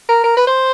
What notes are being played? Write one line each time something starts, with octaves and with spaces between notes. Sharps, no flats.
A#4
A#4
B4
C5